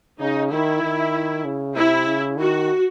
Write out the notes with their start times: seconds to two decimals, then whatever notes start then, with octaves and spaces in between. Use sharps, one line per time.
0.20 C#3 D#4
0.51 D#3 E4
0.83 D#3
1.45 C#3
1.75 C3 E4
2.07 C#3
2.37 D#3 F#4